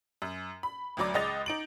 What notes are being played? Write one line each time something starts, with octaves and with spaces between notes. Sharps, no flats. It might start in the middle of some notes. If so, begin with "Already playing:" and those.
F#2
B5
A1 D2 F#3 D5 D6
C#2 G#3 D#5 A6 F7
D#4 D7 F#7